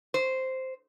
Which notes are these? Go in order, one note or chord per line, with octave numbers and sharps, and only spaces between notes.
C5